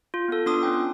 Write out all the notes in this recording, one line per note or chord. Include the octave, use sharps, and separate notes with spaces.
F4
B3 F4 A4
B3 D4 F4 C6 D6 D#6
C#4 G5